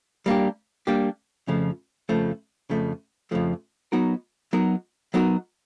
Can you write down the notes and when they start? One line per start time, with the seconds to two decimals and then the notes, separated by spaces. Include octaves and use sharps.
0.26 G3 A#3 D4 G4
0.87 G3 A#3 D4 G4
1.47 F2 C#3 F3 A3
2.09 F2 C#3 F3 A3
2.70 F2 C#3 F3 A3
3.31 F2 C#3 F3 A3
3.92 F#3 B3 D#4 F#4 A#4
4.53 F#3 B3 D#4 F#4 A#4
5.14 F#3 B3 D#4 F#4 A#4